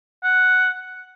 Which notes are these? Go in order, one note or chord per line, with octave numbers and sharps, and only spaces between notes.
F#5